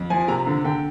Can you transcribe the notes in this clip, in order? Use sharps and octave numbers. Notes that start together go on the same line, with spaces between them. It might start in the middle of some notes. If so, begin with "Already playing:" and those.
Already playing: F2
F3 G#5
C3 A#5
D3
D3 G5